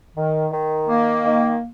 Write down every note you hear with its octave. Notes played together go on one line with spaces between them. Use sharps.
D#3
D#3
A#3
D#3